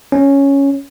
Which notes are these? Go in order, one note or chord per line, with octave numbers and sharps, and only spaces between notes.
C#4